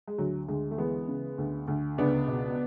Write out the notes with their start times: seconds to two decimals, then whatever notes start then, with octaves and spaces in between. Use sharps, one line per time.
0.07 G#3
0.18 D2 F#3
0.48 D2 G#3
0.71 A3
0.78 E3 G#3 B3
1.08 C#3
1.38 D2
1.68 D2
1.98 C#2 B3 D4
2.28 B2